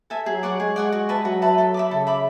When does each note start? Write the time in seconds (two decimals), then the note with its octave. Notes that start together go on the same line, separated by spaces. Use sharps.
0.10 A4 E5 G#5
0.26 F#3 G#4
0.43 D5 F#5 C#6
0.60 G#3 G#4
0.76 D5 F#5 C#6
0.92 F#4
1.09 B4 E5 A5
1.25 F#3 F#4
1.42 B4 E5 A5
1.58 A4
1.74 E5 B5 D6
1.91 C#3 A4
2.07 E5 B5 D6